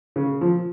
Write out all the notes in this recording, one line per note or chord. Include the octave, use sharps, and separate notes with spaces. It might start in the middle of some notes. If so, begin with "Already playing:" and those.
C#3
F3